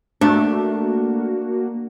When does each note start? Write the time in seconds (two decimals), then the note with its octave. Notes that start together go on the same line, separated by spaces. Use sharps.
0.21 A3 A#3 D4 F#4